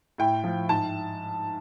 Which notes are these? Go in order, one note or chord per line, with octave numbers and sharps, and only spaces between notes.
A2 G5
F3
G#2 A5